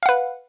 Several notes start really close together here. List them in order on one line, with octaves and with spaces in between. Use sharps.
F5 F#5 B4